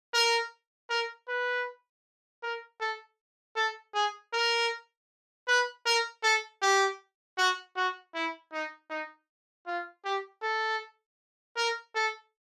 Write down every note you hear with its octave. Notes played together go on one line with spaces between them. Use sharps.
A#4
A#4
B4
A#4
A4
A4
G#4
A#4
B4
A#4
A4
G4
F#4
F#4
E4
D#4
D#4
F4
G4
A4
A#4
A4